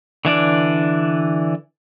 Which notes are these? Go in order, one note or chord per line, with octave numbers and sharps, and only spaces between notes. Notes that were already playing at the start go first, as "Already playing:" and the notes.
D3 E3 D4 D5